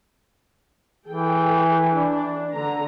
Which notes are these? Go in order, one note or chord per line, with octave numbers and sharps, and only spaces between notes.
E3 G#4 A4 G5
D4
D3 A#5